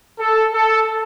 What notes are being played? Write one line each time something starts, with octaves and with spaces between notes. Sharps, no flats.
A4
A4